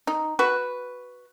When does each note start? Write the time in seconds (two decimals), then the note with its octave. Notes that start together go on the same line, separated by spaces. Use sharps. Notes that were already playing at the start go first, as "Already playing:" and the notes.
0.07 D#4
0.39 F#4 B4